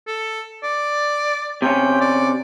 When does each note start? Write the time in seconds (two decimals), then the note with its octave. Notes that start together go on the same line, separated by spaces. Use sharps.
0.07 A4
0.63 D5
1.62 C3 C#4 G5
2.01 D5